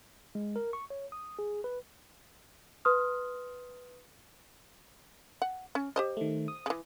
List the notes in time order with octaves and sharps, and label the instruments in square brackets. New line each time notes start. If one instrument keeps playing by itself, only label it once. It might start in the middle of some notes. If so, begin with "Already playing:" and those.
[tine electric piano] G#3
A#4
C#6
C#5
D#6
G#4
B4
[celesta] B4 C6 D#6 F6
[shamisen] F#5
C#4
G4 C5 D#5
[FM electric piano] D#3 A3
D#6
[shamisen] C#3 E3